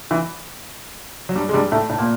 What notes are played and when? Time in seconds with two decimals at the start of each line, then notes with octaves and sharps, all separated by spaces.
0.11 E3
1.29 F#3
1.36 G2 G3
1.49 G#3
1.53 G2 G3
1.72 A2 A3
1.89 A2 A3
1.98 A#2 A#3